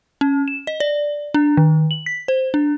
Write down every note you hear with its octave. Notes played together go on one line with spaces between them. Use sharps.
C#4
E7
D#5
D5
D4
D#3
F#7
B6
C5
D4